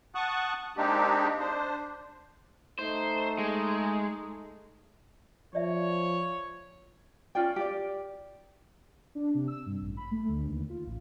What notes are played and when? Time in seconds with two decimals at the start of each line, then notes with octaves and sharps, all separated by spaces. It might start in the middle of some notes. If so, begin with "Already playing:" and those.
0.15 F#5 A5 C#6 D#6 F#6
0.77 G#3 A#3 C4 D4 D#4 G4
1.39 D4 C5
2.79 A3 D#4 C5
3.39 G#3
5.55 F3 C#5 D5 E5
7.35 C#4 F4 D5 G5
7.56 G4 D5
9.15 D4
9.34 C3
9.48 E6
9.66 G2
9.81 A1
9.97 B5
10.11 A3
10.28 D2
10.47 D#2
10.70 F4
10.87 A1